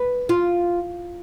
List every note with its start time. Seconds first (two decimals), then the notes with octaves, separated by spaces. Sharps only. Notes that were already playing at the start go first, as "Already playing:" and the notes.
Already playing: B4
0.29 F4